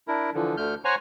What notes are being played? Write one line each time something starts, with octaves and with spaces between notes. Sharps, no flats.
D4 E4 A#4
D3 E3 F3
D2 D3 A3 F6 G6
C5 C#5 F#5 G#5 A#5 C#6